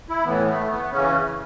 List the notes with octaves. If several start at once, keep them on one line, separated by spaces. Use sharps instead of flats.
E4
A2 E3 B3
A3
B3
C#3 E3 C#4